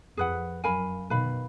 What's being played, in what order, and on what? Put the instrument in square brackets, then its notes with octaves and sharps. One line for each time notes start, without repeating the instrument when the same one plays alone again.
[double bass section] F2 [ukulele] G#4 B4 F#5
[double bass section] F#2 [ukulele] A#4 F5 G#5 B5
[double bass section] B2 D#3 [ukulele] B4 F5 B5